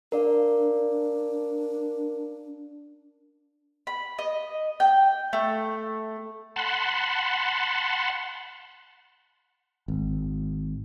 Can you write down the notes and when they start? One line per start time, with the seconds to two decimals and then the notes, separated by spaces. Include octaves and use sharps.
0.12 D4 A#4 D5 F5
3.87 B5
4.18 D#5
4.80 G5
5.33 A3
6.56 F#5 A5 B5 C6
9.88 G#1